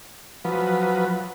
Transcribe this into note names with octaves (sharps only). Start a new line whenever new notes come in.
F3 F#3 B4